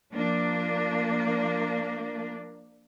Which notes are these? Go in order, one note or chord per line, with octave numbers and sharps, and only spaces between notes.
F3 A#3 D4